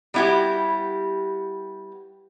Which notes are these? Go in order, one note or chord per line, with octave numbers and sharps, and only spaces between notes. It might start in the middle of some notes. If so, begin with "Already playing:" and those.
G3 B3 E4 F#4 G4